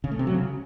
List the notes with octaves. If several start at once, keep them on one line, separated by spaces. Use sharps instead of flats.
C#3
A3
C3
F#3
C#3